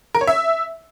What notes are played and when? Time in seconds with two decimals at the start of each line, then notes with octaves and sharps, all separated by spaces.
0.15 A#4
0.21 C#5
0.27 E5